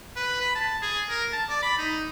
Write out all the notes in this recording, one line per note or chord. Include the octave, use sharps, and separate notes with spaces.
B4
B5
A5
G#4
A#4
A5
D5
B5
D#4